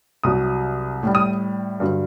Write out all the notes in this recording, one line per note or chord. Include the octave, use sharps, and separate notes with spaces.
C2 C3 F#3 D#6
A2 G3
D#6
G2 D3 F#3